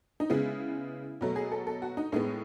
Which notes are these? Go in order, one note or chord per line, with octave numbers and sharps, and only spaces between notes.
D#4
C#3 G#3 B3 E4
B2 F#3 A3
G#4
A4
A4
F#4
D#4
A2 G#3 B3 D#4